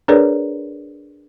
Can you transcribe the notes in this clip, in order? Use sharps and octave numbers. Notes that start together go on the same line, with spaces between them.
D4 G#4 A#4 B4 C#5 D5